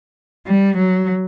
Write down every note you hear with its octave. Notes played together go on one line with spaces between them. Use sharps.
G3
F#3